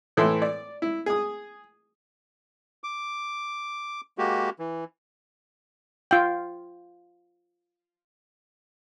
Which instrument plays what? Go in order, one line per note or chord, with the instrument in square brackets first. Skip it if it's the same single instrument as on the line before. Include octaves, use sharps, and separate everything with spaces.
[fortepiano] A2 E3 A4 E5 C6
D5
E4
G#4 D#6
[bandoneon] D6
G#3 A#3 F#4 G4
E3
[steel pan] F4 G5